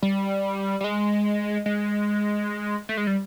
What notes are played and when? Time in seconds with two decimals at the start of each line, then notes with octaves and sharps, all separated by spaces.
0.03 G3
0.81 G3
0.84 G#3
1.66 G#3
2.89 A3
2.97 G#3
3.07 G3